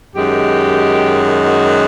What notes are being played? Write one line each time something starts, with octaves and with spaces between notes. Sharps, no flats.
F#2 D#3 G#3 G4
F#4